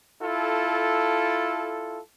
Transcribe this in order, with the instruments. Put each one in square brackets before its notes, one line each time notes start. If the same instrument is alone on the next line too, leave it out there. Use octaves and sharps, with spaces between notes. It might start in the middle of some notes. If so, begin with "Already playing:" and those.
[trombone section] E4 F4 A4